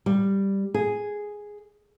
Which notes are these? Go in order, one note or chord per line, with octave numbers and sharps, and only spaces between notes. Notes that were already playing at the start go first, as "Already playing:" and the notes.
G3
G#4